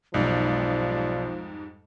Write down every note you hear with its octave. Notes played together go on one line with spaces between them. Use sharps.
B1 F2 G#2 F3 G3 D5